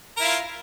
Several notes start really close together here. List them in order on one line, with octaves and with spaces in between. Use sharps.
A#4 E4 F4